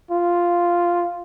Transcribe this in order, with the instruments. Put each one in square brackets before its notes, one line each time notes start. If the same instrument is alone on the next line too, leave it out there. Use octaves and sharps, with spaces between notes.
[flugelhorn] F4